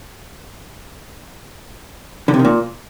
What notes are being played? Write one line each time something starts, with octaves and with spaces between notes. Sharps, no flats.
D3
C3
D#3
A#2